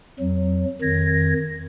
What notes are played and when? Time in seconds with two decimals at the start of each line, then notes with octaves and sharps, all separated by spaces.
0.19 F2 F#3
0.81 F2 D#3 G#6 A#6